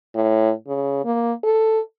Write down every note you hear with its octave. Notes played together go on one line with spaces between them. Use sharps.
A2
C#3
A#3
A4